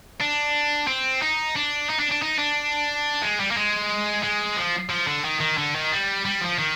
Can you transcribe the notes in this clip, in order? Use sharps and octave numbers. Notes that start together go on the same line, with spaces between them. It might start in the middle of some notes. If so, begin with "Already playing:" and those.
D4
C4
D#4
D4
D#4
D4
D4
D#4
D4
G#3
G3
A#3
G#3
G#3
F3
F3
D3
D#3
D#3
D3
D#3
G3
G3
F3
D#3